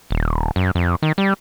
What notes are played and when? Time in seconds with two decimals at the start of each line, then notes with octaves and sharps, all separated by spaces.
0.11 D#1
0.56 F#2
0.75 F2
1.02 D#3
1.18 G3